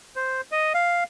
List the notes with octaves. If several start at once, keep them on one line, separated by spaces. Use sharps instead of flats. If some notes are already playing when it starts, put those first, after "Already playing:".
C5
D#5
F5